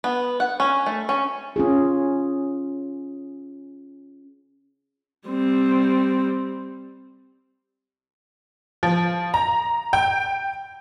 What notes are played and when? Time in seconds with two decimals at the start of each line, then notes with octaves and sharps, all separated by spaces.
0.04 B3
0.40 F#5
0.60 C#4
0.86 A3
1.09 C#4
1.56 C#4 F4 G#4
5.29 G3 C4
8.83 F3
9.34 A#5
9.93 G5